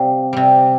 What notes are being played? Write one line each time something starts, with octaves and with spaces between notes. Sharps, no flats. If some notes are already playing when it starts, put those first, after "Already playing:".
Already playing: C3 G3 F5
C3 G3